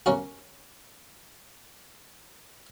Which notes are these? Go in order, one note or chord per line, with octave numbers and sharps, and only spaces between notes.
A#3 C#4 F#4